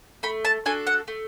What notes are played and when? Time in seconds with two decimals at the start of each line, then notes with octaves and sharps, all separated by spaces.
0.23 A3 B5
0.45 A5
0.66 D4 F#4 A4 G#5
0.87 F#5
1.08 A3